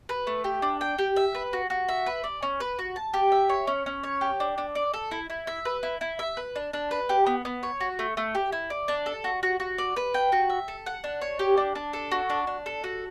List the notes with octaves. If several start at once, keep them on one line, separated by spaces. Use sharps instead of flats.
B4
A3
G4
D4
G5
G4
E5
B4
F#4
F#4
E5
B4
D5
C#4
B4
F#4
A5
G4
E5
C#5
C#4
C#4
C#5
G4
D4
D4
D5
A4
E4
E4
E5
B4
E4
E4
E5
B4
D4
D4
B4
G4
B3
B3
C#5
F#4
A3
A3
G4
E4
D5
D4
A4
F#4
F#4
F#4
D5
B4
G5
F#4
E5
A4
F#5
D4
C#5
G4
D4
D4
A4
F#4
D4
D4
A4
F#4